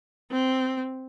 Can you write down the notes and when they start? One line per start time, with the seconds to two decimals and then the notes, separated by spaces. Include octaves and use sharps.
0.31 C4